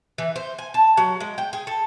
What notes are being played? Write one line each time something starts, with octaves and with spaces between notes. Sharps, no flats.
E3
C5
G#5
A5
F#3
G#3
G5
G#4
A4